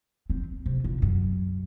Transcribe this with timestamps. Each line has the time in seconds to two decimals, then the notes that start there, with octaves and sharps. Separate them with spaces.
0.30 C4
0.66 C3
0.84 A#2
1.02 F#2